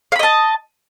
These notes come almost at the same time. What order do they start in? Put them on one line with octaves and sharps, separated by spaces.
F5 B5 D#5 A5